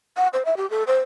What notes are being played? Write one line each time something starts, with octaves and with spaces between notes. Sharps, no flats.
F#5
C5
E5
G4
A4
C5